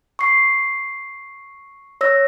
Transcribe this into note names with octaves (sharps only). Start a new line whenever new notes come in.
C#6 C7
C#5 E6 A#6